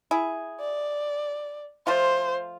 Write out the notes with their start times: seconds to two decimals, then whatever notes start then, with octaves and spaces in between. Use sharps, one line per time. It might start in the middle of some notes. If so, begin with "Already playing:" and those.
0.11 E4 G#4
0.60 D5
1.87 F3 A3 F4 C5